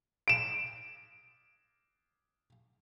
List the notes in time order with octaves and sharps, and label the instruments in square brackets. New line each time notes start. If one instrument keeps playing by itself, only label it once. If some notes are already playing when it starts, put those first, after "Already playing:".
[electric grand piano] D7 E7